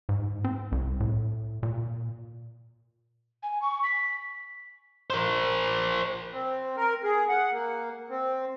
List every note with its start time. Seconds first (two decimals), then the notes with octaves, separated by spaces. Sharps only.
0.09 G#2
0.44 C4
0.72 C2
1.00 A2
1.63 A#2
3.42 G#5
3.61 C#6
3.83 B6
5.10 A#4 C5
6.32 C4
6.77 A#4
7.04 G#4
7.29 F#5
7.52 A#3
8.09 C4